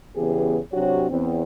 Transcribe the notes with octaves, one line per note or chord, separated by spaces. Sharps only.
E2 C#3 E3 B3 G4 G#4
C3 F#3 D4 F#4 G4 C#5
E2 B3 C4